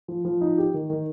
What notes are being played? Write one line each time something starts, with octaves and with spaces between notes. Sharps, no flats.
F3
F3
D#4
G4
D#3
D#3